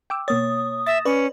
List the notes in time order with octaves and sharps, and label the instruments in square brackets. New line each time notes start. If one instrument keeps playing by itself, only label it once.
[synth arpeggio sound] G5 D6 E6
[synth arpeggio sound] B2 A#3 A6 [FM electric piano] C#5 [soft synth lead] D#6
[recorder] E5 [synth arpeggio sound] A6 A#6 E7
[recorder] C#4 [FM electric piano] B4 [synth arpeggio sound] C#5 D5